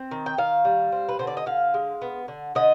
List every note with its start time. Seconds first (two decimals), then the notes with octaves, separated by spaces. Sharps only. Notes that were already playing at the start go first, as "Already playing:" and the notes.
Already playing: C4
0.11 D#3
0.26 G5
0.38 D#3 F5
0.65 G3
0.92 C4
1.09 B4
1.19 D3 C5
1.27 D5
1.37 D#5
1.46 D3 F5
1.74 G#3
2.02 B3
2.28 D3
2.55 D3 D#5